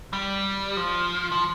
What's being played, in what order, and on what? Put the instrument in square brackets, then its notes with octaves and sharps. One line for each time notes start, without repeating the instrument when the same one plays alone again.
[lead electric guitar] G3
F3
F3